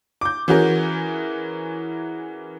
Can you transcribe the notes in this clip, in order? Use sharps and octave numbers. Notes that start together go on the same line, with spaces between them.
D6 G6
E3 C#4 F#4 G#4 A#4